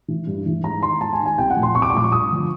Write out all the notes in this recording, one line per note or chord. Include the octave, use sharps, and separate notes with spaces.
E3
G2
E3
G#2 A#5
D#3 C6
G#2 A5
G#5
D#3
G#5
C2 G5
F#5
A#2 F3
C6
C2 C#6
D6
C#6
A#2 F3 D6
C#6
G2 D#6
D3 F3